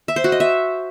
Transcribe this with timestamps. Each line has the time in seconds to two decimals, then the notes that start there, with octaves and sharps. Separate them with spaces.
0.08 E5
0.16 C5
0.24 F#4
0.32 D#5
0.40 E5